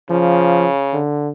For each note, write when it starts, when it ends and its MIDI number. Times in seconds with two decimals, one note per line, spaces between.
0.10 0.98 49
0.10 0.66 53
0.93 1.30 50